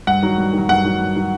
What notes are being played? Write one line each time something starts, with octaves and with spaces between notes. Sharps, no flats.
G2 F#5
D#3 F#3
G2
D#3 F#3
G2 F#5
D#3 F#3
G2
D#3 F#3